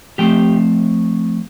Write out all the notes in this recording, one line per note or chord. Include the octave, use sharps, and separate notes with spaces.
F3 A3 C4 G4 G5